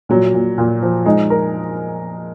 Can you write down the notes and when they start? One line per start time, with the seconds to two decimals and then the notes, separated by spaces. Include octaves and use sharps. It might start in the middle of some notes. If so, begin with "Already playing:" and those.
0.09 A#2 F#3
0.34 A#2
0.58 A#2
0.82 F3
1.06 G#3 D#4
1.30 A#4